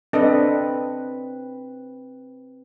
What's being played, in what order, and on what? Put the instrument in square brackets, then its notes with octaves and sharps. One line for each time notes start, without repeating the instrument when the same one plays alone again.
[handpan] C4 B4 [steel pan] D4 A4 D#5